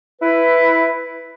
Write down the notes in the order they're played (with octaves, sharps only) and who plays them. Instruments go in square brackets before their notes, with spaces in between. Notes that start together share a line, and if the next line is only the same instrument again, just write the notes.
[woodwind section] E4 B4